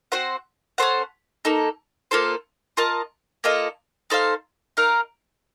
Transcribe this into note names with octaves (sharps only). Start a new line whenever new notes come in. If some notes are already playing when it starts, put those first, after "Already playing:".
C4 F#4 C5 F#5
C#4 A4 C5 F#5
A#3 D#4 A4
A#3 F4 A4 C5
F4 A#4 D#5 A5
A#3 F4 A4 D#5
D#4 A4 C5 F5
D#4 A#4 F5